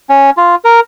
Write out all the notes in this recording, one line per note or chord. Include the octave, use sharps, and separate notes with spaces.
C#4
F4
A#4